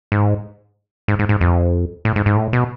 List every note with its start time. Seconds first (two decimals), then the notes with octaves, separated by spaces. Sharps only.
0.12 G#2
1.08 G#2
1.19 G#2
1.29 G#2
1.41 F2
2.05 A2
2.16 G#2
2.26 G#2
2.36 A2
2.53 B2